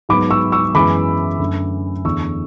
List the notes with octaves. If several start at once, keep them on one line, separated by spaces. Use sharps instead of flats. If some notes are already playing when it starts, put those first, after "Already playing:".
G#2 F#3 B3 B5 D6
C#6 E6
C#6 E6
F#2 E3 G#3 B3 B5 D6
F#2 D3 A3
E2 D3 A3 C#6 E6